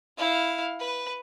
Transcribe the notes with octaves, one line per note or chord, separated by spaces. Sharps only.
E4 F5
B4